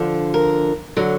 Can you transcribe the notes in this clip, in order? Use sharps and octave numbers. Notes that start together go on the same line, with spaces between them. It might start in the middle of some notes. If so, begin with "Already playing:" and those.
Already playing: D3 F3
A#4
D3 F#3